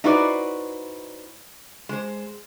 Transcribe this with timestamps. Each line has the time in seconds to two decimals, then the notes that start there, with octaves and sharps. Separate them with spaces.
0.04 D#4 E4 F#4 B4 C5 D5
1.89 G#3 C5